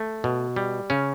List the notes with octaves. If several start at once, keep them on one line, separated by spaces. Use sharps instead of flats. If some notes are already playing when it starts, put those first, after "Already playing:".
Already playing: A3
B2
G3
C#3 C#4